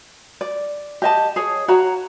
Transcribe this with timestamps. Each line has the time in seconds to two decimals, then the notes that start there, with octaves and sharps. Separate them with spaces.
0.41 D5
1.02 G4 D#5 A5
1.36 G#4 C#5
1.68 F#4 C#5 A#5